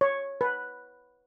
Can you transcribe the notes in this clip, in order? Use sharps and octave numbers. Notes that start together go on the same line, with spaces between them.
C#5
B4